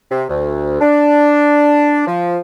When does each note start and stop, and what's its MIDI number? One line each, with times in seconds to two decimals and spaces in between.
0.11 0.24 48
0.29 0.78 38
0.81 2.05 62
2.07 2.39 53